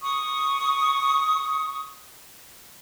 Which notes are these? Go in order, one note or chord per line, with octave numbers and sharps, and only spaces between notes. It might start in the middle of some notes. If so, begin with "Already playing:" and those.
C#6 D#6